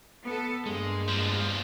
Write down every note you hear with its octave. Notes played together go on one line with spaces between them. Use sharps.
B3 A4
G2 G#3 A#3
E2 F3